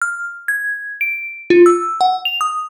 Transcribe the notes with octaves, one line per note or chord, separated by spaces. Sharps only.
F6
G#6
D7
F4
E6
F#5
F7
D#6